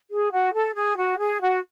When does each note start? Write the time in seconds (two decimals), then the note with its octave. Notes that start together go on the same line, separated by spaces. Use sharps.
0.10 G#4
0.31 F#4
0.54 A4
0.75 G#4
0.97 F#4
1.19 G#4
1.41 F#4